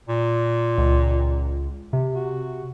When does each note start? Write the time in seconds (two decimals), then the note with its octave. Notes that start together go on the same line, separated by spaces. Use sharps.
0.08 A#2
0.78 C#2
1.93 C3
2.15 F#4